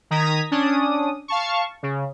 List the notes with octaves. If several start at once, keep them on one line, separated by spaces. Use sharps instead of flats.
D#3 A#5 D#6 G#6 B6
C#4 D4 D#6
F5 A5 C#6
C#3